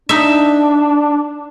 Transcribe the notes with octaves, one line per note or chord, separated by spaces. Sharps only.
D4 D#4 E5